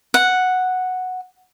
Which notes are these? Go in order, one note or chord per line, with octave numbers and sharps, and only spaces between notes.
F#5